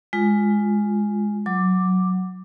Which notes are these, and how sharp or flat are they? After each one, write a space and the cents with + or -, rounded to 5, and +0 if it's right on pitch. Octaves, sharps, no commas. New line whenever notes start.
G#3 +0 F4 +0
F#3 +0 D6 +0